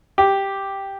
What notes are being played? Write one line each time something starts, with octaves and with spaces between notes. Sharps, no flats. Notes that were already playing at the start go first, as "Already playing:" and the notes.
G4